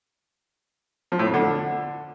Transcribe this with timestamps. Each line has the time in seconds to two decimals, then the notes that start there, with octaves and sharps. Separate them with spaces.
1.12 F3
1.19 A2
1.26 F2
1.34 D3